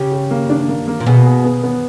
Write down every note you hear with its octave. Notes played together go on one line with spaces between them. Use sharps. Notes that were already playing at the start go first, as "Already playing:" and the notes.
Already playing: C#3 G4
G4
A#3
D4
A#3
A#3
A#2
B2 G#4
G#4
B3
B3